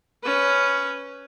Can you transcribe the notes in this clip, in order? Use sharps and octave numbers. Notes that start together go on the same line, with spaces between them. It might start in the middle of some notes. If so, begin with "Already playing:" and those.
C#4 B4